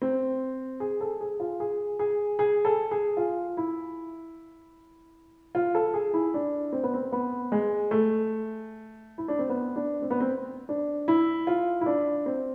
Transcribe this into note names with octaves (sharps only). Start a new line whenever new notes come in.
C4
G#4
A4
G#4
F4
G#4
G#4
G#4
A4
G#4
F4
E4
F4
A4
G#4
E4
D4
C4
B3
C4
B3
G#3
A3
E4
D4
C4
B3
D4
C4
B3
C4
D4
E4
F4
E4
D4
C4